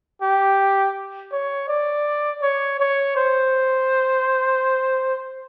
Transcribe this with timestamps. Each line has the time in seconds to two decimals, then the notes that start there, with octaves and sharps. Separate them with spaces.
0.22 G4
1.32 C#5
1.68 D5
2.42 C#5
2.79 C#5
3.16 C5